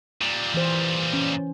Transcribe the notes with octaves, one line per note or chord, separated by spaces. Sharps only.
A#2 G3
E3 C5
C#4